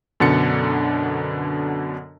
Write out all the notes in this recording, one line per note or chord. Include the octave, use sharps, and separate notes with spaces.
F#2 B2 D3 A6 C#7